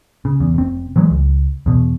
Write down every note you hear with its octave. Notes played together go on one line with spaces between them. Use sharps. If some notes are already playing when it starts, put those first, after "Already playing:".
C#3
E2
F1 C4
E3 F#3 G#3
C#2
E2 B2